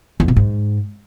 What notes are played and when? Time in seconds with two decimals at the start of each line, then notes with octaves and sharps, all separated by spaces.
0.20 E2
0.28 B2
0.36 G#2